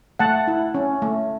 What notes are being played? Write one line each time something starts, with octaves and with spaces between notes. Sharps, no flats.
A3 F#5 A5
E4
C#4
A3